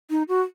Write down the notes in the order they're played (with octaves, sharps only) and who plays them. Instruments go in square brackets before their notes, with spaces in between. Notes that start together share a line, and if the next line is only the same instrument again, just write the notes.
[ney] D#4
F#4